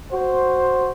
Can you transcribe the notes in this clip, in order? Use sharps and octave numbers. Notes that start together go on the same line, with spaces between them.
F#4 C5